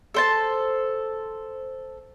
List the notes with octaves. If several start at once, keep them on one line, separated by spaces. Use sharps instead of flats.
A4 C5 A5